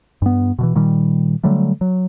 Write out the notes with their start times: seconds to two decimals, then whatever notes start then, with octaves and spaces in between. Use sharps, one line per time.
0.22 G2 B3
0.59 B2 D3 E3
0.75 A#2 D#3 G3
1.44 D3 F#3 G3 A3
1.81 F#3